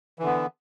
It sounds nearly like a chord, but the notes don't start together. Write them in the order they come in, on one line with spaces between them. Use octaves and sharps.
E3 D3 B3